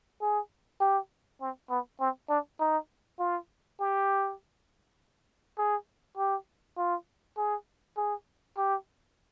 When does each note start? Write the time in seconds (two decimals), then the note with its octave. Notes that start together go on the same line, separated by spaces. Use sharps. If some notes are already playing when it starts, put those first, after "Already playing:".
0.21 G#4
0.80 G4
1.41 C4
1.70 B3
2.00 C4
2.29 D4
2.60 D#4
3.19 F4
3.80 G4
5.58 G#4
6.17 G4
6.77 F4
7.37 G#4
7.97 G#4
8.57 G4